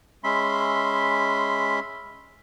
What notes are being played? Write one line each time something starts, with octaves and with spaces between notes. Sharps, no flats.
G#3 C#4 E5 B5 C6